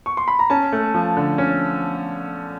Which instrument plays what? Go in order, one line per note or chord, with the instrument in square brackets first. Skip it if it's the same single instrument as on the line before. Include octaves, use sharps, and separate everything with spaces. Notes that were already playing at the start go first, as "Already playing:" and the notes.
[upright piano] C#6
C6
B5
A#5
C#4 A5
A3
F3
D3
C#4